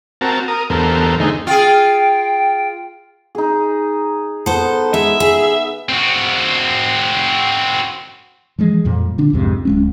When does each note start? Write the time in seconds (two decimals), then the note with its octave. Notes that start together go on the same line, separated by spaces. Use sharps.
0.21 C4 F#4 A#4 A5
0.48 A#4 D#6
0.70 E2 G2 B3 A4 A#4 C5
1.20 D3 D#3 A3 D#4 G#4 C5
1.47 F4 G#4 G5
3.35 D#4 G#4
4.46 B3 A4 C5
4.94 G#3 E5
5.20 G#4
5.89 C4 F#4
8.59 E3 F3 G#3
8.85 F2 A#2 G3
9.18 D3 D4
9.33 B1 F2 G#2 C3
9.65 D1 G#3 C#4